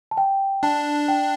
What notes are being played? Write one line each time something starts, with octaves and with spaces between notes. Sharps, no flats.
A5
G5
D4 A5
G5